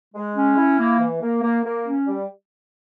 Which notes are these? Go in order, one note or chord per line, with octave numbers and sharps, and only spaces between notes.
G#3
C#4
E4
A#3
E3
A#3
A#3
A#3
C#4
G3